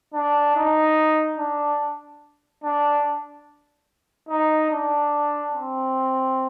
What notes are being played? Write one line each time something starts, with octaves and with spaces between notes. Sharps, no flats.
D4
D#4
D4
D4
D#4
D4
C4